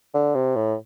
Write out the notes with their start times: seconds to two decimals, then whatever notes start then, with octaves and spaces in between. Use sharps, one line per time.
0.14 D3
0.35 C3
0.56 A2